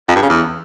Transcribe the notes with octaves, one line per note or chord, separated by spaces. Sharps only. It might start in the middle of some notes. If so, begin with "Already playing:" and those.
F2
G2
C#3
E2